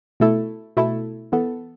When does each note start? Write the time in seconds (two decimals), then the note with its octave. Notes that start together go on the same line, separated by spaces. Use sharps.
0.20 B2 A3 E4 A4
0.77 B2 A3 E4 A4
1.32 E3 B3 A4